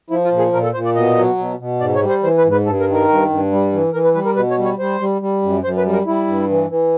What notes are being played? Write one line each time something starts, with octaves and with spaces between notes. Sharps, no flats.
F3 E4
F4
A#2
G#4
A#2 A#4
A4
A#2 C5
D5
B2 D#5
F#3
B2
B2
G#2 D5
C#5
G3
C5
E3 C5
B4
G#2
B4
G2 A4
A#4
D#3
A#4
G2
G2
G3
E3
E3 A#4
B4
G3 B4
A#4
B2 B4
C#5
G3
C#5
G3 C5
G3
G3
F#2
F#2 C5
B4
G3
A#4
G3 E4
G2
E3
E3